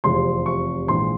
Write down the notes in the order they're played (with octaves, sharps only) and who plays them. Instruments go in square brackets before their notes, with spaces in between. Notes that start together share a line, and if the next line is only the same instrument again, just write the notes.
[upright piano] F1 E2 C3 F3 C6
C#6
A#1 G#2 E3 C6